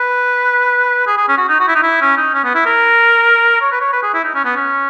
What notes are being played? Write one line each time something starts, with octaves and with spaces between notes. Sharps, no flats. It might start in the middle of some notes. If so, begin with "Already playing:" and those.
Already playing: B4
G#4
G#4
C#4
F#4
D#4
F#4
E4
D#4
E4
C#4
D#4
C#4
B3
E4
A#4
C#5
B4
C#5
B4
G#4
E4
D#4
C#4
B3
C#4